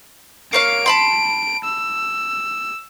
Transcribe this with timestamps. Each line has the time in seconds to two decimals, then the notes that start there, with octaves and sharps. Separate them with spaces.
0.53 A#3 C#5 F5 D7
0.86 A5 B5 C6
1.64 E6